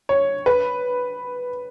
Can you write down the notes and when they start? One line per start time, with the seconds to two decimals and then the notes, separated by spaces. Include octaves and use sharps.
0.09 C#5
0.46 B4